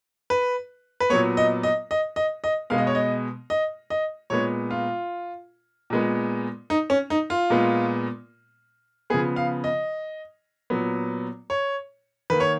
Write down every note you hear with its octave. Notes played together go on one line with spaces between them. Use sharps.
B4
B4
A#2 F#3 B3 C#5
D#5
D#5
D#5
D#5
D#5
B2 G#3 B3 F5
D#5
C#5
D#5
D#5
D#5
A#2 G#3 B3 C#5
F4
A#2 G#3 B3
D#4
C#4
D#4
F4
A#2 G#3 B3
C#3 F3 B3 G#4
F5
D#5
A#2 F#3 B3
C#5
D#3 A#3 B4
C#5